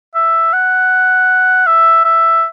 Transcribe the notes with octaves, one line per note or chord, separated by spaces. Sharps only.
E5
F#5
E5
E5